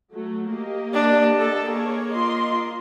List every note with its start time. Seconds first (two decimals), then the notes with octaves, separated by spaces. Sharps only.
0.12 F#3 A3
0.51 A#3 G4 D#5
0.94 D4
1.39 A4
1.70 A#3 G#4 C#5
2.11 F4 D#5 C6